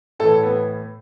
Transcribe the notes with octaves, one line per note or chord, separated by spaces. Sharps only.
A2 E3 A4
B3